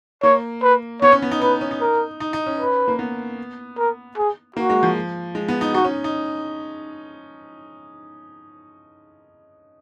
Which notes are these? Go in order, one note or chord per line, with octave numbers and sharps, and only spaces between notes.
A#3 C#5
B4
B3 C#5
C#4
B3
D#4
D#4 B4
C#4
D#4
A#4
D#4
D#4
C#4
B4
A#3
B3
A#4
G#4
A#3 F#4
G#3
F3
G#3
B3
D#4
D#4 F#4
C#4
D#4